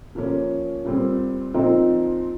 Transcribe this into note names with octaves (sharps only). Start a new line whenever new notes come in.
A#2 F3 A#3 C#4
A#2 G3 C4
A#2 F3 C4 D#4